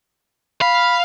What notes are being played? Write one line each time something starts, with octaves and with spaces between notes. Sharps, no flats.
F5 B5